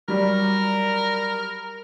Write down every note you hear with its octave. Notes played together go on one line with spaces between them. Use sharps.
F#3 G3 A#4